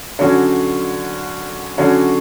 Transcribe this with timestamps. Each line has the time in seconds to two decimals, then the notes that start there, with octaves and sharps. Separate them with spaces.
0.19 D3 F#3 C#4 F#4
1.78 D3 F#3 C#4 F#4